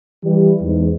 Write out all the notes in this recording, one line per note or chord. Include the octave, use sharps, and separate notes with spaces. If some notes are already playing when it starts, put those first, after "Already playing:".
E3 G3
E2 G#2